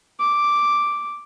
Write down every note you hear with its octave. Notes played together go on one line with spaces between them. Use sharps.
D6